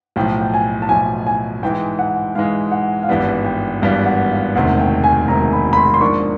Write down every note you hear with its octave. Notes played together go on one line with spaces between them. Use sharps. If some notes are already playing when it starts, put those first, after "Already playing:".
B1 A2 F3 G5
G5
G#5
A5
B1 A2 F3 G#5
G#5
G#2 E3 G#3 G5
F#5
G#2 E3 G#3 F5
F#5
F5
G#1 G2 E3 G3 B3 F#5
G5
G#1 G2 E3 G3 B3 F5
F#5
F5
E1 D2 C3 D#3 F#5
G5
G#5
E1 D2 C3 D#3 A#5
B5
B5
C6
C6
G#2 F3 A#3 D4 C#6